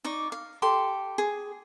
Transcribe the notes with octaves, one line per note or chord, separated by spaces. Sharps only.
D#4 D5 C#6
F5
G4 A4 C6
G#4